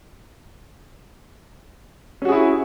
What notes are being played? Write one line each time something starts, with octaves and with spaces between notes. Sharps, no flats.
C#4 E4 F#4 G#4